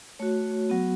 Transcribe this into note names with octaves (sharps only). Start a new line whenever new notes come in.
A3 F#4 C#5
F#3 B3 F#4